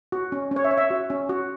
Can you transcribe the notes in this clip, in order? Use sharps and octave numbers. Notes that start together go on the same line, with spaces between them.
F#4
C#4
C#4
C#5
E5
C#5
E5
F#4
C#4
F#4